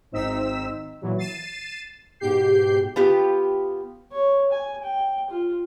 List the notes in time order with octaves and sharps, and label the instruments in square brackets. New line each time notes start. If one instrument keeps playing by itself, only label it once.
[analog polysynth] G#1 C4 D#4 E6 B6 E7
A#2 E3 F#3
A6 C7 D#7 E7
G#2 B2 G4 G6 C7
[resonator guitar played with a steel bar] B3 F4 G4
[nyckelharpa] C#5
G#5
G5
F4